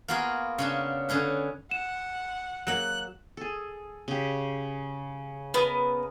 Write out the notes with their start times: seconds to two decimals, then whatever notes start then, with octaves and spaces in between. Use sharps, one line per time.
0.08 A#3 B3 F4 F#4 G#4 A#4
0.58 C#3 C#4 D4
1.09 D3 C#4 G#4 B4
1.71 F#5 E7
2.67 F#3 A#3 F#5 F#6
3.37 G#4 A4
4.08 C#3 G4
5.54 B3 A#4 D#5